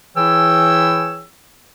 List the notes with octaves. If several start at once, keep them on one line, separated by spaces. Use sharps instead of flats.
E3 E4 G#4 C#5 G5 E6